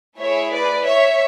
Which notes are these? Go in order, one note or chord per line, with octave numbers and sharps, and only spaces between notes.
A3 E4 G#4 C#5 E5
B4 D5
C#5 E5